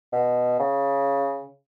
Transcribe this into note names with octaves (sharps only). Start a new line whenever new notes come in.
B2
C#3